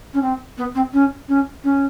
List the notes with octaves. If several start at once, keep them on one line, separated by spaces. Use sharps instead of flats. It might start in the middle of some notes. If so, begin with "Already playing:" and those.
C#4
C4
B3
C4
C#4
C#4
C#4